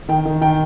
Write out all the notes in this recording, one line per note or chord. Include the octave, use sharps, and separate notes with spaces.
D#3 G5
D#3
D#3 G5